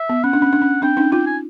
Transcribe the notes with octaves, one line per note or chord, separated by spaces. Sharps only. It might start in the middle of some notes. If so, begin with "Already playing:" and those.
Already playing: E5
B3
C#4 F#5
D4
C#4
D4
C#4
C4 D4 G5
C#4 D#4
D#4 F4 G5
G#5